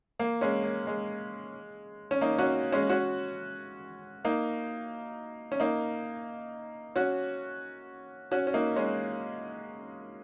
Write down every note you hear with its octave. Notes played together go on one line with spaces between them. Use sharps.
A#3
G#3 C#4
A#3
G#3
C#4
A#3 D#4
C#4 F#4
G#3 C#4
C#4 F#4
A#3 D#4
C#4
A#3 D#4
C#4 F#4
C#4 F#4
C#4
A#3 D#4
G#3 C#4